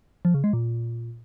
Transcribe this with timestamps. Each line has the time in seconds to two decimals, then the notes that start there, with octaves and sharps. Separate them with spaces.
0.25 F3
0.34 C#3
0.44 G#3
0.53 A#2